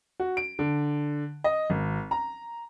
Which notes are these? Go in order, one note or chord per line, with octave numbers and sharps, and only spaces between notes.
F#4
D7
D3
D#5
G#1
A#5